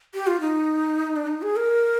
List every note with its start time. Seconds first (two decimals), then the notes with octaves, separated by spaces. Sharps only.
0.15 G4
0.27 F4
0.41 D#4
1.16 D4
1.27 D#4
1.42 G#4
1.56 A#4